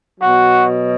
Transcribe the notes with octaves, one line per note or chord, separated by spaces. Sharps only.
B2 F#3 F#4